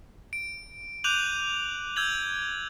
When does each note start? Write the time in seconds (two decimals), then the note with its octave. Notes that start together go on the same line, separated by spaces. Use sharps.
0.33 D7
1.04 D6 F#6 G6 D#7 F7 F#7
1.96 E6 G6 G#6 F#7